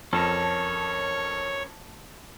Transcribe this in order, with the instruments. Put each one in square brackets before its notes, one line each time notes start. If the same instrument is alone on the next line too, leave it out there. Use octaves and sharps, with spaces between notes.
[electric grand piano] F2 [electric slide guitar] C#4 A4 A#4 [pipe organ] C#5 [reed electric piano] A5